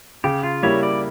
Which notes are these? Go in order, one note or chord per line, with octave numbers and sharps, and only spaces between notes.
C#3 G4
F4
G3 A#3 E4 C#5
D5